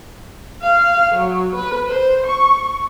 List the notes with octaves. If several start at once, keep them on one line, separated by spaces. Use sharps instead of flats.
F5
F#3
B4
C5
C#6